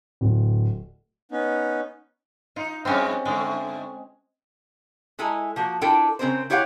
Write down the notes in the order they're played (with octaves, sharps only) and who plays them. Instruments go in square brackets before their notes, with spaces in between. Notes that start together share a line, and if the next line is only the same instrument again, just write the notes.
[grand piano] D1
[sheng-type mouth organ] B3 C#4 D#4
[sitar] D#4 [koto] F4
[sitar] F#2 G#3 [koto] C4 C#4
[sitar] G2 D3 A3 [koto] G#3
[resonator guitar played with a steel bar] G#3 E4 A4 G#5 A#5
F3 A#3 F#4
D4 E4 F4 A4 A#4 G5
C#3 C4 A#4 C5
E4 G4 C#5 F5 F#5